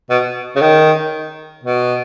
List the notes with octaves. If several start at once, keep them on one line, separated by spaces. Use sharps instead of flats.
B2
C#3
D#3
B2